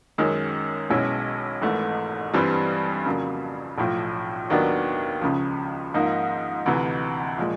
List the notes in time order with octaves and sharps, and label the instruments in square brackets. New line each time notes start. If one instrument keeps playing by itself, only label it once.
[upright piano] F#2 D#3 G#3 C#4
B1 B2 G#3 C#4 E4
G#1 G#2 E3 A3
G2 E3 G3 C4
F2 C#3 F#3 A#3
B1 A2 F3
D#2 D#3 F#3 B3 D4
C#2 C#3 F3
G#2 F3 A#3 D#4
D2 C3 E3
A#2 F3 G#3